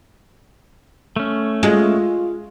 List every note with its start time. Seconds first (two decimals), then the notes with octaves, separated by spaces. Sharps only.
1.16 A3 C#4
1.63 G#3 F4